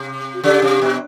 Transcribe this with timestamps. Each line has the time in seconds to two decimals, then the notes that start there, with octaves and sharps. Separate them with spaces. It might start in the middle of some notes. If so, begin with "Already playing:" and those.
Already playing: C3
0.34 F#4
0.43 C#3 G4
0.62 C3
0.82 B2